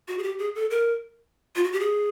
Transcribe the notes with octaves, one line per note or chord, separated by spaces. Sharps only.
F#4
G#4
G4
G#4
A4
A#4
F4
F#4
G4
G#4